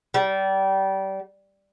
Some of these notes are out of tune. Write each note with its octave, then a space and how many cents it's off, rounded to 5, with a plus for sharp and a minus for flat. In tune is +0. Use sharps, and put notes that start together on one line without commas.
G3 -25